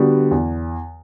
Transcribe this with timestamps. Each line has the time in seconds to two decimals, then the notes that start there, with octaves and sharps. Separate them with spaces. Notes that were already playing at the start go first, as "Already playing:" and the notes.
Already playing: D3 G3 B3 F#4
0.31 E2